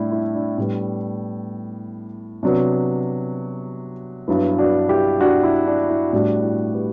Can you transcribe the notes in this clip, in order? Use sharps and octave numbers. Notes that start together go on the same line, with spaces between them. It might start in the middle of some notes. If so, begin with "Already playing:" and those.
Already playing: A2 G3 D4 E4
E4
D4
A2 G3 B3
C3 F#3 B3 D4
G2 F#3 B3 E4
D4 F#4
E4 G4
D4 F#4
E4
D4
E4
A2 G3 B3 D4 F#4
E4 G4
G4 B4